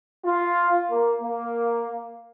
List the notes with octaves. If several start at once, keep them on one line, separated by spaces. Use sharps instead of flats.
F4
A#3
A#3